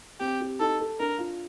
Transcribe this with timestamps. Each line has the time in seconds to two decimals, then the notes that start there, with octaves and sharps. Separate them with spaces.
0.20 C4 G4
0.40 G4
0.59 D#4 A4
0.80 A4
0.99 D4 A#4
1.18 F4